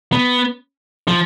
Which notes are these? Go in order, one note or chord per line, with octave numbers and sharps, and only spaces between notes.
B3
F3